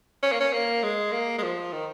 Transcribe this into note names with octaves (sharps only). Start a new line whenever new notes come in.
C#4
A#3
C#4
A#3
G#3
A#3
G#3
F3
D#3